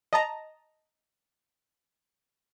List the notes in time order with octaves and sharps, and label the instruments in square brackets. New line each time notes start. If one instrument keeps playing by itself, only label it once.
[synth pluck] D#5 A5 A#5